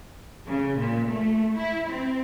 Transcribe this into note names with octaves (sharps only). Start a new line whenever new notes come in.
C#3
A#2
A3
E4
C4